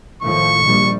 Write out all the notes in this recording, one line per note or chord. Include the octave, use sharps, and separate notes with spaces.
A2 D#3 F3 C#6
A#1 G3